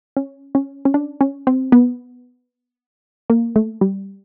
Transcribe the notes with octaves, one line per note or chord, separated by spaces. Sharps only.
C#4
C#4
C#4
D4
C#4
C4
B3
A#3
A3
G3